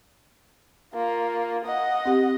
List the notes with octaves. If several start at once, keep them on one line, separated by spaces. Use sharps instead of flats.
A#3 F4
D#5 F#5
C4 G4